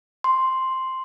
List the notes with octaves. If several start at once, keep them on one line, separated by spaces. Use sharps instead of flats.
C6